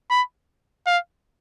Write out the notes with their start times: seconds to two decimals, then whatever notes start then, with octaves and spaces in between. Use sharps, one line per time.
0.10 B5
0.86 F5